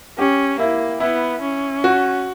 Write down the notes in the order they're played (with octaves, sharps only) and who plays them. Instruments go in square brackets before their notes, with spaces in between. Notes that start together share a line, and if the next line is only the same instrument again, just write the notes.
[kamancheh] C#4 [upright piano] G4
[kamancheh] A#3 [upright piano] E4
[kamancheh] B3 [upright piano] E4
[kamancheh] C#4
[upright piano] F#4